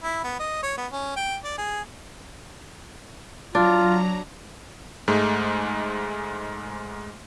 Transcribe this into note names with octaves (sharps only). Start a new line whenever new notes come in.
E4
B3
D#5
C#5
B3
C#4
G5
D5
G#4
F#3 D4 F4 A#5
G#2 G#3 A3